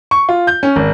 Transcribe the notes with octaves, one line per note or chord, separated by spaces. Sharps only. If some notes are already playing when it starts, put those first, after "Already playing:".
C#6
F4
G6
C#4
G#1